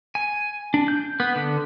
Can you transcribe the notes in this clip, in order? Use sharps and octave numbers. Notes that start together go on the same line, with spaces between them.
G#5
D4
G6
B3
D3